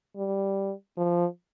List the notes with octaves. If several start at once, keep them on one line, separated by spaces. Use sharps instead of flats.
G3
F3